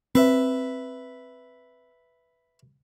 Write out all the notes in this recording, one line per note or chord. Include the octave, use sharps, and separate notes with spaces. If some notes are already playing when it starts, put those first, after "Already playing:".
C4 B4 E5